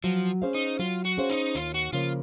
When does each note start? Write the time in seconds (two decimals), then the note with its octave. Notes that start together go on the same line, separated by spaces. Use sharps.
0.04 F3 F#3
0.42 C#4 G#4 C5 F5
0.54 D#4
0.79 F#3 F4
1.05 F#4
1.18 C#4 G#4 C5 F5
1.30 D#4
1.55 D#2 F4
1.74 F#4
1.93 C#3 F3 A#3 F4